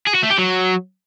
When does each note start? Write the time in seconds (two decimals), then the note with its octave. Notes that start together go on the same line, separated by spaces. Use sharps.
0.07 G#4
0.15 F#4
0.23 A3
0.31 G4
0.39 F#3